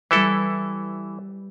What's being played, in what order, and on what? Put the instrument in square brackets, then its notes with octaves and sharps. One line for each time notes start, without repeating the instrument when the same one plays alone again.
[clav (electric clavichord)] E3 E4 A4 [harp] G3 G4 B4